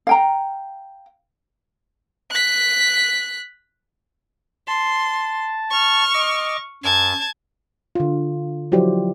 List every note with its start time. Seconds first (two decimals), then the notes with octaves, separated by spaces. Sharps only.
0.07 F5 G5 A#5
2.32 F#6 B6
4.67 A5 C6
5.71 C#6 F6
6.14 D#5 D6
6.84 F#2 A5 G#6
7.95 D3 F4
8.72 F3 F#3 E4 G4 C5 D5